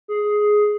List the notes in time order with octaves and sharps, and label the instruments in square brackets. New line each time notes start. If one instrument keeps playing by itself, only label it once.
[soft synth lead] G#4